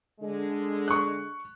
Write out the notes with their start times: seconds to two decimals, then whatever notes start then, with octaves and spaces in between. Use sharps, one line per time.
0.20 D3 G#3
0.88 C#6 F#6